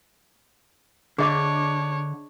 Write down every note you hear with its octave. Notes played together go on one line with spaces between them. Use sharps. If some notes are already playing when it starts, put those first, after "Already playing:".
D3 D4 G#4 C#5 D#5 D6